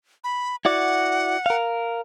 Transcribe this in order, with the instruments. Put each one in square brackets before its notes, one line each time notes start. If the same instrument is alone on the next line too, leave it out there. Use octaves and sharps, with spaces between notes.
[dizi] B5
[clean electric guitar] E4 F#4 D5 [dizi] F#5
[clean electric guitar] A#4 F5